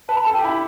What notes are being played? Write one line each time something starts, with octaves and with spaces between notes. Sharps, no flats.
B4 A5
B5
A5
A4
G5
G4
E4 B5